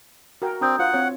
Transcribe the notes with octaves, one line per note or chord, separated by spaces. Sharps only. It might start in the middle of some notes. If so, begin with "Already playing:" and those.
F#4 A#4 G5
C4 D4 A#5 D#6 G6
F4 C5 F5 F#5
C4 C#5